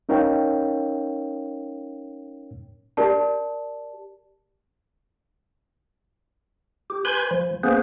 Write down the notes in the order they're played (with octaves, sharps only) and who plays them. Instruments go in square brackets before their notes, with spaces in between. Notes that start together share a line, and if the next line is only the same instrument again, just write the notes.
[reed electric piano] C#4 D#4 A#4 C#5 F5 G5
[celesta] G4 A#4 D5 A5
[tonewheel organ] G4
B4 G#5 B5 C6 G6 G#6
F3
A#3 B3 C#4 G#4 B4 C5